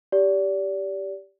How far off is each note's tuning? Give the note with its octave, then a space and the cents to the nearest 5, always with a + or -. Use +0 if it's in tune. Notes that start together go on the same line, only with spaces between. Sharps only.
G4 +0 D5 -30